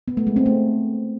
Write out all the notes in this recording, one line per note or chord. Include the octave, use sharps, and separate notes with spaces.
B3
A3
G#3
C4
A3